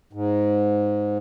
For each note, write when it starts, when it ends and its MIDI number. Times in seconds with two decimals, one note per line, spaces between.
0.13 1.18 44